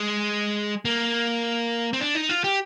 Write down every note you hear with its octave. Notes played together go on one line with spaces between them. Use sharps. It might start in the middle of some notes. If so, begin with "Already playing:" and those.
Already playing: G#3
A#3
C4
D4
D#4
F4
G4